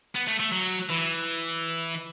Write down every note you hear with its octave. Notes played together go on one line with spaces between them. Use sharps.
B3
A3
A3
F#3
E3